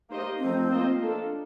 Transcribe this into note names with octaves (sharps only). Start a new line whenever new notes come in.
A#3 D#4 G4 C5 D#5
F3 A3 C4 D#4
A#3 F4 C5 D#5
A#3 D4 A4